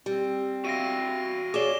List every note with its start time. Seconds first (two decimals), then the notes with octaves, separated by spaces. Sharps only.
0.06 G3 C4
0.65 F#4 E5 F5 A#6 D7 D#7
1.54 G#4 C#5 D5 D6 E7 G7